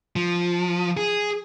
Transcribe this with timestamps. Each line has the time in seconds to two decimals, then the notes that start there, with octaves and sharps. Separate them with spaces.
0.16 F3
0.97 G#4